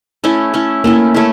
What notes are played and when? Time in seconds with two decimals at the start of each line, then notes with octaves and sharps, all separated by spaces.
0.24 A3 C#4 E4
0.53 A3 C#4 E4
0.84 A3 A#3 C#4 E4
1.14 A3 C#4 E4